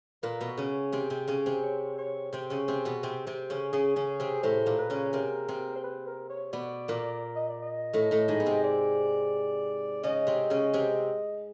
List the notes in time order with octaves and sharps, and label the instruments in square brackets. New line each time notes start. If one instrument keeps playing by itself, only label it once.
[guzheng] A#2 A#3 [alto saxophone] B4
[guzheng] B2 B3
C#3 C#4
C3 C4
C3 C4
C#3 C#4
C3 C4
[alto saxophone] C#5
C#5
[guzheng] C3 C4
C#3 C#4
C3 C4
B2 B3
C3 C4
C3 C4
C#3 C#4
[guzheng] C#3 C#4 [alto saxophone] G#4
[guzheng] C#3 C#4
C3 C4
[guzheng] A2 A3 [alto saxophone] C5
[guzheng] A#2 A#3
[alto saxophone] B4
[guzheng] C#3 C#4
[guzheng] C3 C4 [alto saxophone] A#4
[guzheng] C3 C4
[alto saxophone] C5
B4
A#4
C#5
[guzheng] B2 B3 [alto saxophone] D5
[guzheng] A#2 A#3
[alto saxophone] D#5
D5
D#5
[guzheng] A2 A3
A2 A3
G#2 G#3
B3
C3 C4
[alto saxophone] D5
[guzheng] C#3 C#4 [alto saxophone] D#5
[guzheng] C3 C4
C#3 C#4
C3 C4